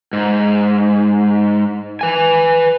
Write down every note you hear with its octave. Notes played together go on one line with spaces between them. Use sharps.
G#2
B4 G#5